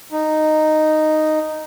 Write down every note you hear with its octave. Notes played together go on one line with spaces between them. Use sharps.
D#4